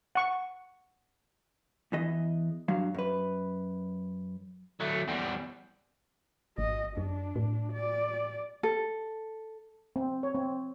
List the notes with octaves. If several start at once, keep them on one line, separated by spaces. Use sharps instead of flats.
F#5 C#6
E2 E3 D#5
G2 F#3 F5
F#2 B4
F#3 A3
E2 G3
G#1 D#5
F#2 D4
A2
D5
A4
C4
C#5
C4